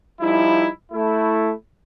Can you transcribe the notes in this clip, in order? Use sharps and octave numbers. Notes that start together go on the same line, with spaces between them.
F3 G3 D#4 E4
A3 E4